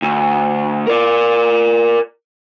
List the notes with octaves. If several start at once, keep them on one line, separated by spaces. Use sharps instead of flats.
D2
A#4 D5